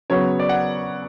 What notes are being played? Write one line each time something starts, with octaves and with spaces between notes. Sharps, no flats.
C#3 F#3 B3 C#5
D5
F#5